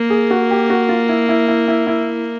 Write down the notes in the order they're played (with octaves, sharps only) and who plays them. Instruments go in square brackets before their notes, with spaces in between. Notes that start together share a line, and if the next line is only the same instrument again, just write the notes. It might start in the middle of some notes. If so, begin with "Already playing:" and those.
Already playing: [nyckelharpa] A#3
[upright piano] G#4
F#4
G4
F#4
F4
E4
E4
E4
E4
E4